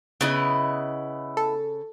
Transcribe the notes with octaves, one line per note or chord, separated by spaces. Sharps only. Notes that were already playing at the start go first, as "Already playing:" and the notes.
C#3 B3 E4 D#5
A4